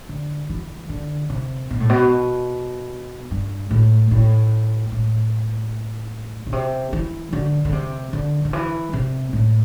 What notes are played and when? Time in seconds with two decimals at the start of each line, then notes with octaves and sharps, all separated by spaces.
0.09 D3
0.49 E3
0.89 D3
1.30 C3
1.71 B2
1.80 A2
1.89 B2
3.31 G2
3.71 A2
4.11 A2
4.92 A2
6.46 B2
6.53 C3
6.93 E3
7.33 D3
7.65 D3
7.72 C3
8.13 D3
8.45 D3
8.53 E3
8.93 C3
9.33 A2